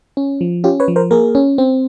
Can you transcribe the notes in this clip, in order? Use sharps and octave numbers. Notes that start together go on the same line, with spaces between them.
C#4
F3
C#4 F4 G4
B4 C#5
F3
A#4 C5
A#3 G#4 A#4
C#4
C4